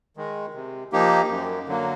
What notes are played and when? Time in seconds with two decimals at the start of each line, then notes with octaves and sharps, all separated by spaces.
0.17 D#3 G#3
0.54 C3
0.92 F3 A#3 D#4 G4
1.29 F#2
1.67 D3 F#3 A#3